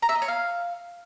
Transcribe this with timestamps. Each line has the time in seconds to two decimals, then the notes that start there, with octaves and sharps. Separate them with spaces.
0.02 A#5
0.09 E5
0.15 D#5
0.22 C#5
0.28 F5